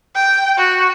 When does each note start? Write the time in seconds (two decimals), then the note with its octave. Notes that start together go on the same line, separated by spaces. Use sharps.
0.15 G5
0.57 F#4